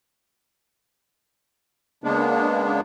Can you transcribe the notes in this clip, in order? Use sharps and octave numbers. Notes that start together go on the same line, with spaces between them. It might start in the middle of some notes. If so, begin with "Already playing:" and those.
C#3 G#3 A#3 B3 D4